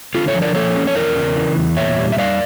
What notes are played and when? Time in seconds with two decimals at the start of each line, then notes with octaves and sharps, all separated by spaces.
0.14 D3 F4 A4
0.28 A4 C#5
0.34 F3
0.42 A#4 D5
0.55 A#3 A4 C#5
0.76 C#4
0.87 C#5
0.95 E2 A#4 D5
1.16 C#3
1.36 E3
1.57 E2
1.77 A#2 C#5 E5
1.98 G3
2.12 E5
2.18 G3 D5 F5